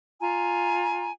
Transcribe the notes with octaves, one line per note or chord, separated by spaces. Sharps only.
F4 G#5 A#5